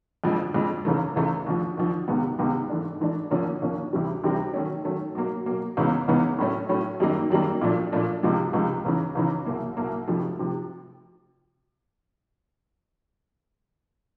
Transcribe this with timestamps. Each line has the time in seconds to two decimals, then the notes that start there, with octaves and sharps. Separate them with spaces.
0.24 F2 D3 F3 G#3
0.54 F2 D3 F3 G#3
0.85 C#2 C#3 E3 A3
1.16 C#2 C#3 E3 A3
1.47 D#2 D3 F3
1.77 D#2 D3 F3
2.08 C#2 C3 D#3 G#3 B3
2.39 C#2 C3 D#3 G#3 B3
2.70 G#2 E3 A3 D4
3.01 G#2 E3 A3 D4
3.31 D#2 D3 F3 A#3 C#4
3.62 D#2 D3 F3 A#3 C#4
3.93 D2 C3 E3 G3 C4
4.24 D2 C3 E3 G3 C4
4.54 D#3 F#3 A3 C#4
4.85 D#3 F#3 A3 C#4
5.15 B2 F#3 A#3
5.46 B2 F#3 A#3
5.77 C#2 C#3 E3 G#3 B3
6.08 C#2 C#3 E3 G#3 B3
6.39 A2 F#3 A3 C#4
6.69 A2 F#3 A3 C#4
7.00 F#2 D#3 G3 A#3 D#4
7.31 F#2 D#3 G3 A#3 D#4
7.61 A#2 F3 A3 D4
7.92 A#2 F3 A3 D4
8.23 C#2 C3 F3 G#3
8.53 C#2 C3 F3 G#3
8.85 C#2 C#3 E3
9.15 C#2 C#3 E3
9.46 C2 B2 F#3 A#3
9.77 C2 B2 F#3 A#3
10.08 F2 C3 F3 A3
10.39 C3 F3